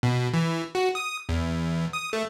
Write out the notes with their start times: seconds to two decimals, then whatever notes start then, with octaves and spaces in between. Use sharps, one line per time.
0.03 B2
0.34 E3
0.75 F#4
0.95 D#6
1.29 E2
1.93 D#6
2.13 A3